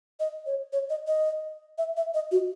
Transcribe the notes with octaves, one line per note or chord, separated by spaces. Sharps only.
D#5
C#5
C#5
D#5
D#5
E5
E5
D#5
F#4